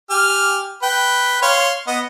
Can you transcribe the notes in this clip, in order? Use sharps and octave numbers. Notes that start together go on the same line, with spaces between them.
G4 G#5 F6
B4 G5
C#5 F5 C6
B3 D#5 F#5